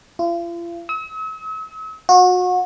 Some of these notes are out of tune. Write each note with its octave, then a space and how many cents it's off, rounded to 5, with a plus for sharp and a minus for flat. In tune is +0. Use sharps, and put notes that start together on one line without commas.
F4 -40
E6 -45
F#4 -30